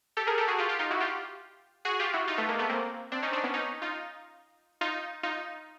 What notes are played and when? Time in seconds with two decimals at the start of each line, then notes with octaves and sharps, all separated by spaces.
0.17 G4 A4
0.27 G#4 A#4
0.38 G4 A4
0.48 F#4 G#4
0.58 F4 G4
0.69 F4 G4
0.79 D#4 F4
0.91 E4 F#4
1.00 F4 G4
1.85 F#4 G#4
2.00 F4 G4
2.13 E4 F#4
2.28 D#4 F4
2.37 A3 B3
2.49 G#3 A#3
2.59 A3 B3
2.69 A#3 C4
3.12 C4 D4
3.22 C#4 D#4
3.32 C4 D4
3.43 B3 C#4
3.54 C#4 D#4
3.82 D#4 F4
4.81 D#4 F4
5.23 D#4 F4